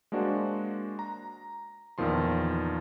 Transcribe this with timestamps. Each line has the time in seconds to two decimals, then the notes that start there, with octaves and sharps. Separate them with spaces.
0.12 G#3 A#3 D4 F#4 C5
0.99 A#5
1.98 E2 A#2 D#3 F3 C6